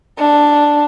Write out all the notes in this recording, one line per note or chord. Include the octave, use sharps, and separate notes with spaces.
D4